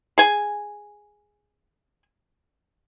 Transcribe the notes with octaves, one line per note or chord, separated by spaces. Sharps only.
G#4 G#5